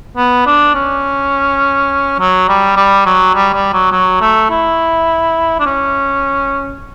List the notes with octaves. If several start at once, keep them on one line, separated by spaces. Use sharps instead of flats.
B3
D4
C#4
F#3
G3
G3
F#3
G3
G3
F#3
F#3
A3
E4
D4
C#4